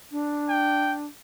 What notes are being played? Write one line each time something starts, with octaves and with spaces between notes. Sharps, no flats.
D4
G5